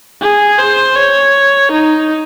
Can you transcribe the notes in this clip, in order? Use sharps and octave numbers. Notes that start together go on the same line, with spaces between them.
G#4
C5
C#5
D#4